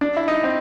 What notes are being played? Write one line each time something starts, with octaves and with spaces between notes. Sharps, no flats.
D4
E4
D#4
C4